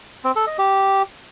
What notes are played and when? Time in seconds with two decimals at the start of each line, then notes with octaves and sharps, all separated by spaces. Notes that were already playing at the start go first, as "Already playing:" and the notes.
0.24 C4
0.36 A4
0.47 D#5
0.58 G4